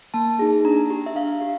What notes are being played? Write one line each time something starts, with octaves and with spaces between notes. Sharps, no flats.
A#3 A5
D#4 G#4
D4 A#5
G4
E5
D4 F5
G4